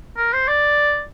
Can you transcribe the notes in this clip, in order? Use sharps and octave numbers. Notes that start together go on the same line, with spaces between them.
A#4
C5
D5